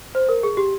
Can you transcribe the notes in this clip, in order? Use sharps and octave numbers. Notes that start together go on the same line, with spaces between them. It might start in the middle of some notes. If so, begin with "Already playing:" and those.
C5
A#4
G#4
G4